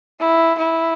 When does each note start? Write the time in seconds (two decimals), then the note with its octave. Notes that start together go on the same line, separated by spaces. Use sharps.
0.19 E4
0.58 E4